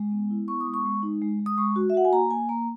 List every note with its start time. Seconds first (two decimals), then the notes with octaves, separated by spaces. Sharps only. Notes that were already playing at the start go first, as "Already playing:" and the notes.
Already playing: G#3
0.12 B3
0.31 E4
0.48 B3 C#6
0.61 D#6
0.67 G#3
0.74 C#6
0.85 G#3
1.03 D#4
1.22 G#3
1.39 G#3
1.46 D#6
1.58 G#3 C#6
1.76 F#4
1.90 E5
1.94 F#4 F#5
2.05 G#5
2.12 A#3 A#5
2.31 A#3 G#5
2.49 A#3 A#5